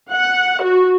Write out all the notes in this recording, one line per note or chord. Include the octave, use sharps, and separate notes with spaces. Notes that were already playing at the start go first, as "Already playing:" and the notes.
F#5
F#4